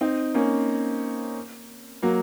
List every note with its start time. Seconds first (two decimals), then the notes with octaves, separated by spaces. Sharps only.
0.01 C4 D#4
0.34 A#3 C#4
2.03 F#3 A#3